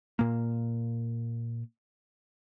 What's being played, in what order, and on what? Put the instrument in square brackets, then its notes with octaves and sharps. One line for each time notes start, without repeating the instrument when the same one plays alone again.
[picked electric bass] A#2 A#3